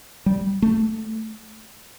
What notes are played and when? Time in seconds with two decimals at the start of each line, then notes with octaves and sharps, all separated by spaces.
0.26 G3
0.62 A3